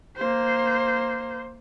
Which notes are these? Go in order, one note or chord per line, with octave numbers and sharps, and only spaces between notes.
A#3 C5